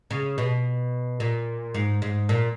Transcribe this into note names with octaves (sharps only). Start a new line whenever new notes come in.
C#3
B2
A#2
G#2
G#2
A#2